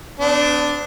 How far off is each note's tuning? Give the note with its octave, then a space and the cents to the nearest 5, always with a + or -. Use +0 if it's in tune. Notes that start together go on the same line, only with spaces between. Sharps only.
B3 +45 D4 +0